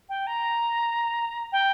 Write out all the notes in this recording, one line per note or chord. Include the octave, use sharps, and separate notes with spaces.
G5
A#5
G5